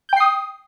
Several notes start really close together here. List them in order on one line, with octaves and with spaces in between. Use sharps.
G6 G5 C7 D#6